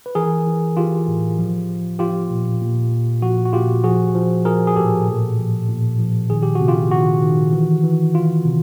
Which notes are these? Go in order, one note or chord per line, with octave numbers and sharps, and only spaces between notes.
B4
E3 G#4 A#4
E3
E3 F4 G4
A2
F3
F3
F3 F4 G4
A#2
A#2
A#2
F3 F#4
F#4
A#2 F4 G4
F3 F#4 G#4
F3
F3 G#4 A#4
G#4
A2 G4 A4
A#2
F3
A#2
F3
D#3 G#4
G4
F#4
C3
F4 G4
D#3 F#4
D#3
E3
E3
E3 F4
C3